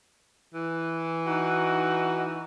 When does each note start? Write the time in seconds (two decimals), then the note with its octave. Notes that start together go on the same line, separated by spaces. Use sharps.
0.54 E3
1.26 D#4 F#4